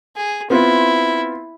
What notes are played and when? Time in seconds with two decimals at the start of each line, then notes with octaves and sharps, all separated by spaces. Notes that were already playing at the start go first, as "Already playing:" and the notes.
0.16 G#4
0.50 B3 C4 E4 F4